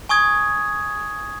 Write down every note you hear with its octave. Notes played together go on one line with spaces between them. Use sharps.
G#5 C#6 D#6 G#6